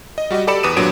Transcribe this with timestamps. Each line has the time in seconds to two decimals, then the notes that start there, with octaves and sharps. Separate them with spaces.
0.18 D#5
0.30 G3 F#4 G4 D#5
0.47 G4 A4 D5 B5 C#7 E7
0.63 E2 B4 D6 D#6 D#7 E7
0.76 G#1 A#2 F#3 D4 B4 D7